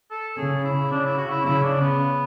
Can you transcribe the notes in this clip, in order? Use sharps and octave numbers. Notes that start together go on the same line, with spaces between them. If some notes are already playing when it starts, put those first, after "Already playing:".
A4
C#3 G#4
E4
C#3 D4
E4
F#4
E4
C#3 E4
D4
B3